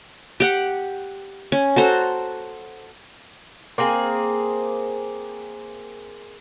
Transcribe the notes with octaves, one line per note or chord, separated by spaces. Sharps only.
G4 F#5
C#4
F#4 A4 C5 A#5
A#3 C4 G#4